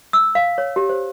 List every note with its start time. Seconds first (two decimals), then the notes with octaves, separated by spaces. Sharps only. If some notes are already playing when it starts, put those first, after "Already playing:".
0.13 E6
0.35 F5
0.58 C#5
0.76 G4
0.89 C5